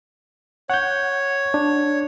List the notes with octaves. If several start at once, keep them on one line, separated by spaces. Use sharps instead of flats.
C#5 F#5 G6
D4